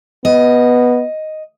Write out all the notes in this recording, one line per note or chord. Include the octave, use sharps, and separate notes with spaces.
B3 D#5